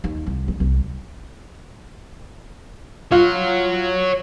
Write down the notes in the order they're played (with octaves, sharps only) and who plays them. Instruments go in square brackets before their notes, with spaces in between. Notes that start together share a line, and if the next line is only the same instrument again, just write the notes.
[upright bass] D#2
C2
D3
C2
[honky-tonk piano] F4 [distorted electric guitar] C#5 F#5